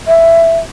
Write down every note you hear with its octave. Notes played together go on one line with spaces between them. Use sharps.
E5